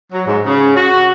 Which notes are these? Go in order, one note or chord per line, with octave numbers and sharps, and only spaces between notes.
F#3
G#2
C#3
F#4